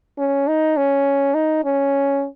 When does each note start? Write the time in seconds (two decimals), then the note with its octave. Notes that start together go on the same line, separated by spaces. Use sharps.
0.18 C#4
0.48 D#4
0.77 C#4
1.35 D#4
1.65 C#4